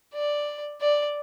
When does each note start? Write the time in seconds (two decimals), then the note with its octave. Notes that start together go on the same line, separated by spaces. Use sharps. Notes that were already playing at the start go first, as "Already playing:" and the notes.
0.14 D5
0.81 D5